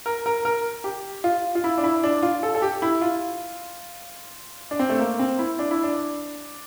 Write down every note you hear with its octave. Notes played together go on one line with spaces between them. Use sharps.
A#4
A#4
A#4
G4
F4
F4
E4
D4
E4
D4
F4
A4
A4
G4
E4
F4
D4
C4
A3
A#3
C4
E4
D4
E4
D4